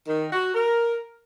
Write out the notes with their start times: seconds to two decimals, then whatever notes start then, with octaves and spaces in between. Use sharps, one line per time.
0.08 D#3
0.32 F#4
0.55 A#4